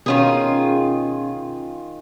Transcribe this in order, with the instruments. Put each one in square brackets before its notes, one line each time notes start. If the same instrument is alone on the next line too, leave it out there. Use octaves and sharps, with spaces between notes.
[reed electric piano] B2 C#4 [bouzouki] D#3 F4 G#4